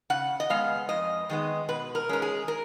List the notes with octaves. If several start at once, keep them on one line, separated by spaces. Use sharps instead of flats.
C#3 F#5
D#5
G#3 B3 F5
F2 D#5
D#3 G#3 B3 D#5
B2 B4
A#4
G#3 C#4 A#4
G#4
A#4